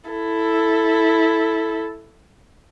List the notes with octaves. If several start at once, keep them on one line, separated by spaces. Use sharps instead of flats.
E4 A4